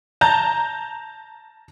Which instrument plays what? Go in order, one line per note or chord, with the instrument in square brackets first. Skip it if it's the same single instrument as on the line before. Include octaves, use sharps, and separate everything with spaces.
[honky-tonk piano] A5 A#5 G6